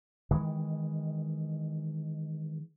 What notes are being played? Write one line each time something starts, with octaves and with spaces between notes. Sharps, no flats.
D#3 E3 G#3